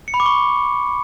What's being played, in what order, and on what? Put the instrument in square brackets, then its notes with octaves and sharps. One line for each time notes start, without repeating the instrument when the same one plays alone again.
[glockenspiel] C#7
B5
D6
C#6